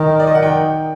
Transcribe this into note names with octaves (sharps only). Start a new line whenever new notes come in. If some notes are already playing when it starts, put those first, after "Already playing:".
Already playing: D#3 G5
D5
D#5
F#5
G5